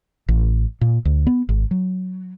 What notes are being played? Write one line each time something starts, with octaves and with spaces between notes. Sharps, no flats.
A1
A#2
D2
B3
G#1
F#3